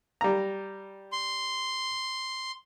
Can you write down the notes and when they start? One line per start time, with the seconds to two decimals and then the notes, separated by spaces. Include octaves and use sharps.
0.21 G3 A#5
1.12 C6